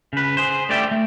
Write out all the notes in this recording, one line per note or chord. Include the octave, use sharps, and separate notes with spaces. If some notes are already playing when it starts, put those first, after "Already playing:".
C#3 B4
G#4 C5
D3 A3 G4 D5 E5 G5
A3